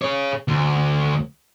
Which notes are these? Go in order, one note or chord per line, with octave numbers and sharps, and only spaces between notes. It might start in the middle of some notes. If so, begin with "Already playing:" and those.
G#4 C#5
D2